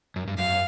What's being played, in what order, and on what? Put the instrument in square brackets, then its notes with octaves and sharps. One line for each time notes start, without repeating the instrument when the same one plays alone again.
[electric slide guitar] F#2
G2
[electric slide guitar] F#2 [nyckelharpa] F5